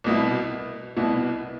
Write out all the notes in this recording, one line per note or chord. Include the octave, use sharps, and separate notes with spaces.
C2 B2 B3 E4
C2 B2 B3 E4